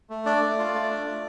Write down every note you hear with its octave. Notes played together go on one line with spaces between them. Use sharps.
A3
D4 D5
A3
F4
A3
D4
A3